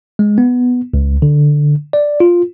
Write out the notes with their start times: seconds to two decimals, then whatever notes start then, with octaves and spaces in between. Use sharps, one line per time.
0.19 G#3
0.38 B3
0.94 C#2
1.22 D3
1.93 D5
2.20 F4